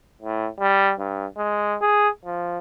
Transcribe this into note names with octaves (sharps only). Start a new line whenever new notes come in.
A2
G3
G2
G#3
G#4
F3